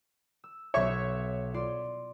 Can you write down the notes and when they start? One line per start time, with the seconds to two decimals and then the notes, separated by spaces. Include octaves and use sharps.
0.44 E6
0.74 B1 C#5 E5 C#6 E6
1.54 F4 D5 C6